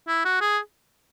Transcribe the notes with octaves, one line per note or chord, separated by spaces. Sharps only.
E4
F#4
G#4